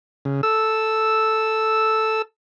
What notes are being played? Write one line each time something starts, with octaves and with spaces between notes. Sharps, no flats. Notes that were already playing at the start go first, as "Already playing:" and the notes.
C#3
A4 E6